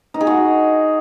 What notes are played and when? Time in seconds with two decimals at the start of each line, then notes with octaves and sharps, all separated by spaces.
0.14 D#4
0.21 G#4
0.27 F#4